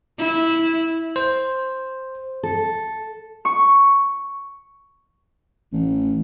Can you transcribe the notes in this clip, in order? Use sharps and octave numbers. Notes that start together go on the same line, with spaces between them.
E4
C5
A4
C#6
A1